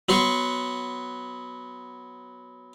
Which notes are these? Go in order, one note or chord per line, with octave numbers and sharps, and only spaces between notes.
F#3 B3 C6 C#6